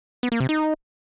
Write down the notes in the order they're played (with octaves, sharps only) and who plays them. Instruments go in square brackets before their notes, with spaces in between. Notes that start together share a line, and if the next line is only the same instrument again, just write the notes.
[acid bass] B3
A#3
C3
D#4